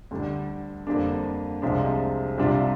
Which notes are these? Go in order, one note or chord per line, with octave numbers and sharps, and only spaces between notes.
D2 D3 G3 D4
F2 D3 G3 A#3 D4
C2 C3 F3 G#3 D4
C2 C3 G3 D4 F4